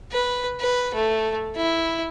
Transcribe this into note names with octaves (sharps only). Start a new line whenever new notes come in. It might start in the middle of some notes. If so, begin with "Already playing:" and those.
B4
B4
A3
E4